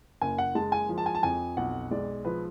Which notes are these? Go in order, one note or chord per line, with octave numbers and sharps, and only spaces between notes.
F#1 G#5
F#5
G#3 A5
G#5
F3
A5
G#5
A5
F2 G#5
B1 F#5
G#3 D5
F3 B4